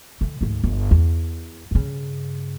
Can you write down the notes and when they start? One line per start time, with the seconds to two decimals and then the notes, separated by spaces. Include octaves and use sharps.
0.21 D3 E3
0.41 D2 G#2
0.64 G1
0.91 E2
1.71 G2 C#3